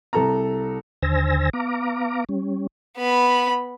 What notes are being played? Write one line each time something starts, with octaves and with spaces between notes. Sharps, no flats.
C2 A4 A#5
D#2 D3 C5 G#5 E6 A#6
B3 F5 A#5 D6
G3 C#4
B3 B5